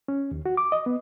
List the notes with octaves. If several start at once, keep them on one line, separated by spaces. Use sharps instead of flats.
C#4
D#2
F#4
D6
D#5
B3